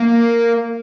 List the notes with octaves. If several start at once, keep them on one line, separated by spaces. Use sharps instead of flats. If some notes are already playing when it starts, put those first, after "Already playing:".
Already playing: A#3